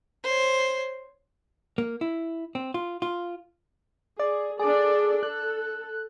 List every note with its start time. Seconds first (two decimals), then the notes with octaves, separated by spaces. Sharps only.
0.24 C5 C#5
1.78 A#3
2.01 E4
2.55 C4
2.74 F4
3.02 F4
4.19 G#4 D5
4.59 D4 G#4 A4 D5
5.23 A4 F#6